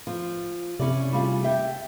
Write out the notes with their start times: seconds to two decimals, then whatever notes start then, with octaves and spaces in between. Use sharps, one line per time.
0.07 F3
0.80 C3 C#4 E4 D5
1.13 G3 F4 G#4
1.43 G4 E5 G5